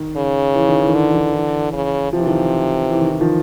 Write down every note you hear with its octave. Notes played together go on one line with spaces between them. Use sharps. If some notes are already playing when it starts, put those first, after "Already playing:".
Already playing: D#3
C#3
E3
D#3
E3
D#3
D3 E3
D#3
E3
C#3
C3 F3
E3
D#3 F3
E3
D#3
E3
D#3 F3